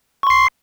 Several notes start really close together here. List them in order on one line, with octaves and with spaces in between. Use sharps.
C#6 C6 C7